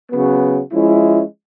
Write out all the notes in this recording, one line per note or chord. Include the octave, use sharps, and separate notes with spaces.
C#3 F#3 B3
F3 G#3 C#4 E4